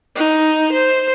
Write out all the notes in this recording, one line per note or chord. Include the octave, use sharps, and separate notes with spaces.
D#4
C5